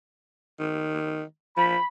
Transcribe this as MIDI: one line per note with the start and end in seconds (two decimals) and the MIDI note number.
0.59 1.23 51
1.57 1.77 53
1.57 1.85 83